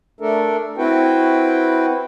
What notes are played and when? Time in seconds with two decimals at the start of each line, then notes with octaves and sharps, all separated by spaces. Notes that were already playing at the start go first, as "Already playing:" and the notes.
0.21 A3 D4 A4 A#4
0.78 C4 E4 F#4 B4 G5